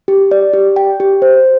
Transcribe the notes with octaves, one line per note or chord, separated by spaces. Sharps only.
G4
D5
G4
G5
G4
C5